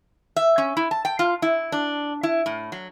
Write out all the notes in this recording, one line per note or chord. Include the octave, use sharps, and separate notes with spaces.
E5
C#4
E4
A5
G5
F4
E4
D4
E4
A2
F#3